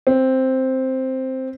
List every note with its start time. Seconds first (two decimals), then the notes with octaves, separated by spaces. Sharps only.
0.07 C4